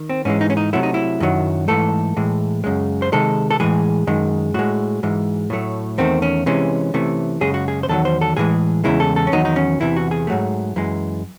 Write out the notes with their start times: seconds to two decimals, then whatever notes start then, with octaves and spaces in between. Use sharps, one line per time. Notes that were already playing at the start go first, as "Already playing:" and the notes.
Already playing: D#3
0.09 C4
0.25 G#2 E3 G#3 C#4
0.41 D#4
0.50 C#4
0.57 D#4
0.73 C3 F#3 A3 E4
0.83 D#4
0.94 E4
1.20 F#2 D#3 F#3
1.68 G#2 E3 A3 A4
2.17 A2 E3 G#3
2.64 F#2 C#3 G#3
3.02 C5
3.12 C3 D#3 G#3 A4
3.51 A4
3.60 A2 E3 G#3 G#4
4.07 F#2 D#3 G#3
4.54 A2 G#3 F#4
5.03 G#2 E3 G#3
5.50 A2 F#3 A3
5.98 E2 D#3 A3 C4
6.22 C#4
6.46 C3 E3 G#3 C#4
6.94 C3 E3 A3
7.41 F#2 C#3 G#3 G#4
7.54 F#4
7.68 G#4
7.83 C5
7.88 E2 D#3 F#3 A4
8.05 C5
8.21 A4
8.37 A2 E3 G#3 G#4
8.84 E2 C#3 G#3 E4
9.00 A4
9.16 A4
9.27 C#4
9.32 E2 D#3 F#3 D#4
9.45 D#4
9.56 C#4
9.80 E2 C3 E3 E4
9.96 F#4
10.11 G#4
10.27 G#2 F#3 A3
10.76 F#2 E3 G#3